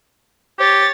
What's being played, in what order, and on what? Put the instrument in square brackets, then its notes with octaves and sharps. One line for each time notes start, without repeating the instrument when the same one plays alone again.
[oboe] G4 [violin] C#5 A6